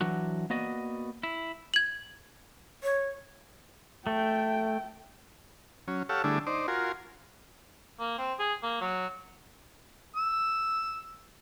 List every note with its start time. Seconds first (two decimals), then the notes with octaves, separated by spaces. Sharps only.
0.01 E3 F#3 D4 F#4
0.50 A#3 B3 F#4 D5 D#5
1.23 E4
1.74 G#6 F#7
2.83 C#5
4.07 A3 G5
5.88 F#3 C#4
6.09 G4 A4 C#5 F5 F#5 E6
6.24 D3 G3 A3 D4 E4 G#4
6.47 D#4 C5 D5
6.68 F4 F#4 A#4 G#5 C6
8.00 A#3
8.18 C4
8.39 G#4
8.63 A#3
8.81 F#3
10.16 E6